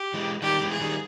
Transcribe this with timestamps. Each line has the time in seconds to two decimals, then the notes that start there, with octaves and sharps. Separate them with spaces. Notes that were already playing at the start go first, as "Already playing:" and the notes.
Already playing: G4
0.14 E3 G#3
0.42 D#3 G3 G4
0.61 E3 G#3
0.72 G#4
0.81 D#3 G3